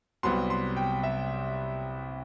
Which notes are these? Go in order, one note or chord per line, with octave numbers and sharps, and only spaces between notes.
C2 C3 F#3 B3 C6
C6
G5
E5